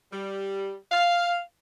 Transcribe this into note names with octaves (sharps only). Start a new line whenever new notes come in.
G3
F5